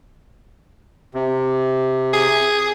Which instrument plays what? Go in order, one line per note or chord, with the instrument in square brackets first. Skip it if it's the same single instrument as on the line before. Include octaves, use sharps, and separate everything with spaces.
[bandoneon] C3
[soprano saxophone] G#4